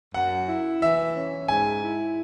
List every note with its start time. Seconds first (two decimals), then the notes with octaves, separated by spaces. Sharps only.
0.14 F#2 F#5
0.47 E4
0.81 E3 E5
1.15 C#4
1.48 G#2 G#5
1.82 E4